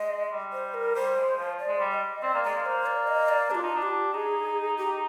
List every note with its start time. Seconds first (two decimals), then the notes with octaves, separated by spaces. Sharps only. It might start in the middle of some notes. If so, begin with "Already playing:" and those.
Already playing: G#3 D#5
0.32 G3
0.52 C5
0.74 A#4
0.95 G3 C5
1.17 G#3
1.37 F3
1.59 D5
1.68 G#3
1.80 G3
1.91 D#5
2.22 C4 D5
2.34 A#3
2.44 G#3 D5
2.57 A#3
2.66 C5
2.86 D5
3.07 D#5
3.29 D5
3.50 D4 G4
3.55 F4
3.63 D#4
3.75 D4
3.82 G4
4.13 D#4 G#4
4.77 G4